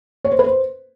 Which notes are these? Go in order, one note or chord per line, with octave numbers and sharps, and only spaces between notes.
C#5
C5
B4
C5